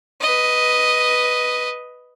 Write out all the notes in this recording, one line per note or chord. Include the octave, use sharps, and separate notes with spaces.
B4 D#5